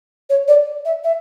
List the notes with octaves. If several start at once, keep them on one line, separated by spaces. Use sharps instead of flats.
C#5
D5
E5
E5